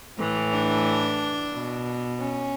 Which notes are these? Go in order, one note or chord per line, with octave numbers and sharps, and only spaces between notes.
A2 E3
D4
B2
C#4